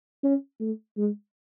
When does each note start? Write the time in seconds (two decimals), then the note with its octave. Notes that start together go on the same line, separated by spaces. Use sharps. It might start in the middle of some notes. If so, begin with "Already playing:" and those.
0.24 C#4
0.60 A3
0.98 G#3